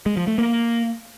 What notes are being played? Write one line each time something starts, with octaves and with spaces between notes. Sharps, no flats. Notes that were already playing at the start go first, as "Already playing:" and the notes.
G#3
F3
A3
A#3